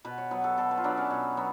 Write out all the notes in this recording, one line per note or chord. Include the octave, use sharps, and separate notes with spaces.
B2 B4
C#5
F#3 B3 B4
A4
B2 A4
B4
F4
F#3 B3 D4
C#4
B2
F#3 B3